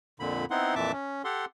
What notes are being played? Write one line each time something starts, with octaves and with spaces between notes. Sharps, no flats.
F2 A#2 D3 B5
B3 C4 D#4 E4 F#5 C6
F2 A#2 E3 E5 A5 D6
C#4
G4 A4 F#5 C6